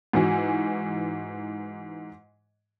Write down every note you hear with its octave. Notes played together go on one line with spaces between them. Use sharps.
G#2 E3 F#4